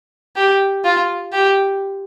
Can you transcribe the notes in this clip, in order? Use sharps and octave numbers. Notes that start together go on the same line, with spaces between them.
G4
F4
G4